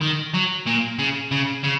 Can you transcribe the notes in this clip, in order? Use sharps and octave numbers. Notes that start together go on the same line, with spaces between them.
D#3
F#3
A#2
C#3
C#3
C#3